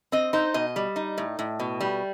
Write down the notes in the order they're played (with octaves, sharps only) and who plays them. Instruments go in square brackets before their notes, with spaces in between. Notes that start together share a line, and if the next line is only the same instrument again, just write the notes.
[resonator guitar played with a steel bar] C4 D#5
D#4 C5
B2 D#5
G3
D#4
A2
A2
B2
G3